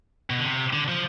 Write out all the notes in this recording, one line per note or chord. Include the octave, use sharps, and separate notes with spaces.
B2
D3
C3
D3
F3